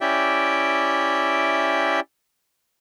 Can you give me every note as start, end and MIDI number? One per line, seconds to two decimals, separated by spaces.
0.01 2.00 61
0.01 2.00 64
0.01 2.00 67
0.01 2.00 74
0.01 2.00 76
0.01 2.00 79